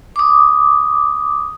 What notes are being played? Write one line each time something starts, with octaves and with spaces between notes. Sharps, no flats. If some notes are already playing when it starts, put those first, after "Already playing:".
D6 D#6